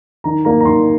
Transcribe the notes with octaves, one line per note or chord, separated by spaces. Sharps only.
D#3 A#5
A#3 A#5
A#5
D#3 C6